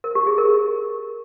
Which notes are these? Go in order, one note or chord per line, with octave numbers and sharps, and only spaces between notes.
A#4
G4
G#4
A#4